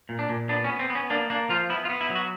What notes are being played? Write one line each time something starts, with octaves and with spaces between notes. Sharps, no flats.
A#2
D4
A#2
B3 D4
C#4
B3
C4
B3
C#4
A#3 D4
A#3 D4
F3 F4
B3 E4
F4
B3
E4
F#3
F#4